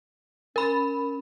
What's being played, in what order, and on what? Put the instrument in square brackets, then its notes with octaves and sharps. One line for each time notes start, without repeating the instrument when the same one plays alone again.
[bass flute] C#4 [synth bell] A#4 B5